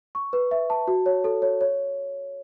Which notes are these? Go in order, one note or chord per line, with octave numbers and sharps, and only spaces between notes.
C#6
B4
E5
A5
F#4
C#5
A4
C#5
C#5